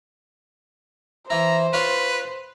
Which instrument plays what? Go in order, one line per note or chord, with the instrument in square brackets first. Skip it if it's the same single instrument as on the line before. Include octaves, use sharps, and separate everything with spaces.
[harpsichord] E3 E4 [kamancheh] C5 [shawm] A#5
[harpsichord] F4 C#5 [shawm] B4